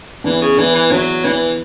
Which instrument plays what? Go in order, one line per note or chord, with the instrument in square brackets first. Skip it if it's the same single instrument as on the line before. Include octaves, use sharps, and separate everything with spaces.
[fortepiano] E2 [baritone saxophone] E3
[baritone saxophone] C#3
[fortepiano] E2 [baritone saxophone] E3
[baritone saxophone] E3
[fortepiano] E2 [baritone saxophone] F#3
[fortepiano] E2 [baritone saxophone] E3